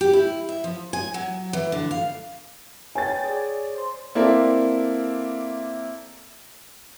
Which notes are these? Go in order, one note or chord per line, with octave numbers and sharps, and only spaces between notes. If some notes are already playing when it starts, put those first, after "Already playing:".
G4
E4
E5
F3
G#5
F#3
E3
D3
F5
B4 C#5 G5 G#5 A6
G#4 C#5 D5
C5 C6
A#3 C4 E4 A4 D5